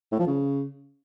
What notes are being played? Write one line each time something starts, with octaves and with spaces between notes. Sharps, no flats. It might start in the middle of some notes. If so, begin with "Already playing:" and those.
A2
F3
C#3